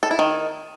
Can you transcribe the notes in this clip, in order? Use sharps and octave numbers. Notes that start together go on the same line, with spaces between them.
A4
E4
D#3